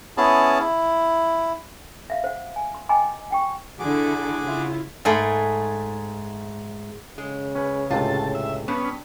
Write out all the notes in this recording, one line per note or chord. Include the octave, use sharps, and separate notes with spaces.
B3 C#4 E4 G#4 A5
E4
E5 F5
C5 F#5
G#5
C6
D#5 G5 G#5 A#5 C6 D6
F#5 G5 C#6
D3 E4 F#4 G#4 A4 D6
C#3 E4 F4
G#2 A3 G#4 B5
C#3 G#3
C#4 B4
C#2 A2 C3 F4 A5
E5
G2 B3 C#4